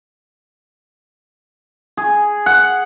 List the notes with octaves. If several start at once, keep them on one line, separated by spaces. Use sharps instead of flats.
G#4
F#5